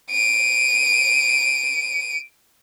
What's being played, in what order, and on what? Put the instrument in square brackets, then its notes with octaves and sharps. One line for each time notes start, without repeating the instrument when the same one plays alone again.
[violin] D7 D#7